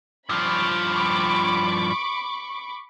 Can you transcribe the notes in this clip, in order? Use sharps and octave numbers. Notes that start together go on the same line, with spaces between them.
G2 F3 B5 C#6 D6